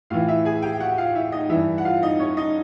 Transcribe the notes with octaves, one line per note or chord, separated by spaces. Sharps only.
A2 E3 F4 F5
E4 E5
G#4 G#5
G4 G5
F#4 F#5
F4 F5
E4 E5
D#4 D#5
G2 E3 E4 E5
F#5
F4 F5
D#4 D#5
C#4 C#5
D#4 D#5